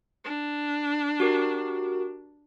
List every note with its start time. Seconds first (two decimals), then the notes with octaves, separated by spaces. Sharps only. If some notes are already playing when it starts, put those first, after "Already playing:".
0.25 D4
1.20 F#4 G4 A#4